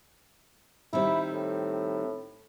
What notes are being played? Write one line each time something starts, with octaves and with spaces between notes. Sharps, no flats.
D#3 G3 C4 E4
A2